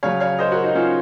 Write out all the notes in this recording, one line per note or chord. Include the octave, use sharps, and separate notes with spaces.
C#3 F#3 C#5 F5
C#5 F5
C5 D#5
F#4 A#4
D#4 F#4
C#4 F4